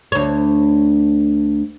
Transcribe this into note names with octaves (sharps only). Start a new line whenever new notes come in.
D2 C#5